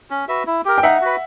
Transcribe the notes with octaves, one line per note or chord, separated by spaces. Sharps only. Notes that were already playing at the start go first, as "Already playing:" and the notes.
C#4
F#4 B4 E5
E4
G4 A#4
G5
D#4 E5 F#5
F#4 B4